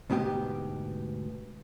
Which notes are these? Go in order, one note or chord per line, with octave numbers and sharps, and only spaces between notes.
D2 G#2 B2 B3 G4